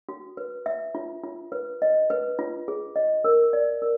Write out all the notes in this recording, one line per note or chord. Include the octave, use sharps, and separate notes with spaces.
F#4
B4
E5
F4
F4
B4
D#5
B4
F4
G#4
D#5
A#4
D5
A#4